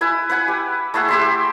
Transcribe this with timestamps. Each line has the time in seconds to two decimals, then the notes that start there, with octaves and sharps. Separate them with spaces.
0.01 E4 B4 G#5
0.29 B4 F#5 G#5
0.48 G4
0.94 A3 E4 G#4 F#5
1.08 G4 E5 C6